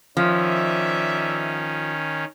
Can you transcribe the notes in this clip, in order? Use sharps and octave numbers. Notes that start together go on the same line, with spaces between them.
D#3 F3 C#4 D5 E5